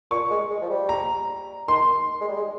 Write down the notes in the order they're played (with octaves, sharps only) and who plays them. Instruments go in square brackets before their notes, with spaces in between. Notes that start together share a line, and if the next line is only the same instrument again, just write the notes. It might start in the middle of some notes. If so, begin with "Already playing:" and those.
[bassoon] A#2 [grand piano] C#6
[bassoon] G#3
G#3
F3
G3
[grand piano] A#5
[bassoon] D#3 [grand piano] C6
[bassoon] G#3
G3
G#3